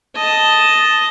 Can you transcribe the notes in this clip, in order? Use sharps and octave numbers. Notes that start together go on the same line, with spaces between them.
D#5 A5